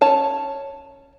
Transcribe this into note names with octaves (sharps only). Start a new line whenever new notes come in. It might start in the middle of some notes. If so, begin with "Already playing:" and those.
C#4 C#5 A5